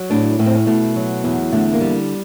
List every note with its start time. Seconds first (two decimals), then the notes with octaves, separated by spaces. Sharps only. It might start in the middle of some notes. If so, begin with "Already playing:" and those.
Already playing: F#3
0.10 A2 D4
0.39 A2 C#4
0.46 C4
0.55 C#4
0.67 B2 A3
0.96 F#3
1.24 E2
1.53 D3 A3
1.73 A#3
1.81 G3